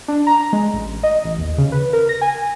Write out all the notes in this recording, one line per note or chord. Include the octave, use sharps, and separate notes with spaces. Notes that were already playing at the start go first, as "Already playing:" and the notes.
D4
A#5
G#3
A1
D#5
A1
D#2
C#3
B4
A#4
A#6
G#5